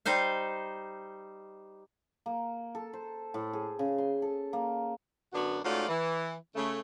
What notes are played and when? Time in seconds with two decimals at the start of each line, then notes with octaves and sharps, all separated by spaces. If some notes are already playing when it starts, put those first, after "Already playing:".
0.06 G3 D#4 C5 F5
2.26 A#3
2.75 A4
2.93 C5
3.34 A2
3.53 G#4
3.79 C#3
3.98 C6
4.22 A4
4.53 A#3
5.33 F#2 D3 B3 D4 F#4
5.63 G#2 A3 C#4 F4 F#4 D5
5.88 E3
6.56 C#3 A3